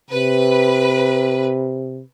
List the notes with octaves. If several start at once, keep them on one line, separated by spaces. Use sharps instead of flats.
C3 B4